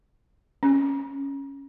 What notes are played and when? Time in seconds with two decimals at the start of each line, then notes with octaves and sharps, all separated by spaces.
0.63 C#4